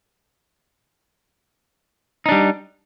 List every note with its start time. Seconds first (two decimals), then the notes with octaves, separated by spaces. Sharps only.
2.26 D#4
2.29 D4
2.32 G3